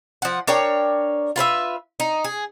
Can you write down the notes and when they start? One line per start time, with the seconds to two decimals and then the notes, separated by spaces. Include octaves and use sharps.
0.22 F3 F#5
0.48 D4 A#4 C#5 G5
1.36 F4 B4 C5 E5
2.00 D#4
2.25 G#4